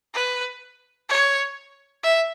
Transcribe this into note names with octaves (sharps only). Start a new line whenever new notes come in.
B4
C#5
E5